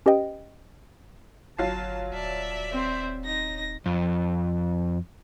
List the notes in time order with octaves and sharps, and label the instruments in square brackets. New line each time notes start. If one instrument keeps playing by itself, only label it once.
[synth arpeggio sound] C#4 G4 B4 D#5 G5
[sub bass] G1 [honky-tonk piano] F#3 F4 C7 [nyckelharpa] A5
[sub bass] D#1 [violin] D5 E5 [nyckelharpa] A5
[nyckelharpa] C4 C5
[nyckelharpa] D#4 [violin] A#6
[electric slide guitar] F2